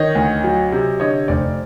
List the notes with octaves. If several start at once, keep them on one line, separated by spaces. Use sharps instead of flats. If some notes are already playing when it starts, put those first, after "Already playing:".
Already playing: D#3 C#5 D#5
D2
F#3
C3
D3 C#5 D#5
F1 C5 D5